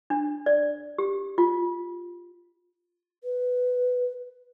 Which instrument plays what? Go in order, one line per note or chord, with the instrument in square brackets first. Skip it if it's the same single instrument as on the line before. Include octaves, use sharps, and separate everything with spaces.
[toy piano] D4
D5
G4
F4
[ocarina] B4